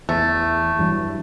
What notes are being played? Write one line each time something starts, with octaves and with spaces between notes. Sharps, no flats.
E2 A3
G2 E3 F#3